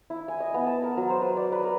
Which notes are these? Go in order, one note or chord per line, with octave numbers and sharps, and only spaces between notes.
E4
G#5
D#5
B3
A5
A#4
F#3
C5
B4
D5
B4
A#4